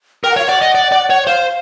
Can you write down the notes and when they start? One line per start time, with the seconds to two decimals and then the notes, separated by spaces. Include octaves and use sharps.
0.24 A#4 G5
0.30 F#5
0.37 C#5 F5
0.45 D5 F#5
0.62 D#5
0.75 D5
0.92 D5
1.10 C#5
1.27 C5 F5